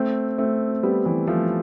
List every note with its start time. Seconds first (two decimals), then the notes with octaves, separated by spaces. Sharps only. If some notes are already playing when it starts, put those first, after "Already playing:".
Already playing: A3 C4
0.38 A3 C4
0.83 G3 B3
1.06 E3 G3
1.27 F3 A3